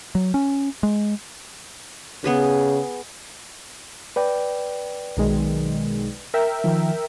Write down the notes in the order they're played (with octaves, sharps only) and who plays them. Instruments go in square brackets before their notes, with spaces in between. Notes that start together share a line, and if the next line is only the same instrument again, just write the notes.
[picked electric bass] F#3
C#4
G#3
[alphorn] C#3 [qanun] B3 G#4 B4
[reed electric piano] B4 D5 G5
[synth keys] B1 D#3 G#3
A#4 E5 G5
[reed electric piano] D#3 F3